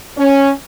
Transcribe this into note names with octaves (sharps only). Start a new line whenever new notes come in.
C#4